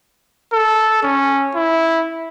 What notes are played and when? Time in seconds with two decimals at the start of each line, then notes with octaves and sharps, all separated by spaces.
0.53 A4
1.03 C#4
1.55 E4